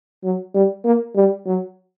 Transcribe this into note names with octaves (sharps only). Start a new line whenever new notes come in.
F#3
G3
A#3
G3
F#3